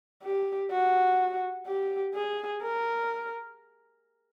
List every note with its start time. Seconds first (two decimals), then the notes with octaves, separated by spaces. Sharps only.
0.23 G4
0.71 F#4
1.67 G4
2.14 G#4
2.62 A#4